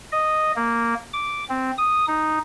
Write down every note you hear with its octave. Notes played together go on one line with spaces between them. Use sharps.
D#5
A#3
D6
C4
D#6
D#4